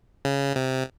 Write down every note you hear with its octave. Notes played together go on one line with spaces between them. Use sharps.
C#3
C3